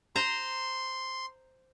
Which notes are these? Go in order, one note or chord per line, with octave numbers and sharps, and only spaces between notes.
C5 A#5 C6